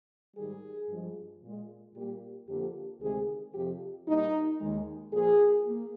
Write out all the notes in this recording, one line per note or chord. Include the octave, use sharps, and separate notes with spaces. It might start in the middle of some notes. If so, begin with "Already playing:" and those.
G#2 D#3 G3 G#4
G2 F3 G#3
A#2 G#3
A#2 G3 A#3 G4
F2 D3 F3 A#3 G4
D2 C3 D#3 G#3 G#4
F2 C3 F3 G4
A#2 G3 A#3 D#4
D#2 D#3 G#3
A#2 F3 A#3 G#4
A#3